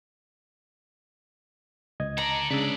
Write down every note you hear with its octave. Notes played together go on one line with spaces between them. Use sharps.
C#2 D#5 G#6
A4 D5 A#5
C#3 G#3 C#4 D4 B4 D5 E6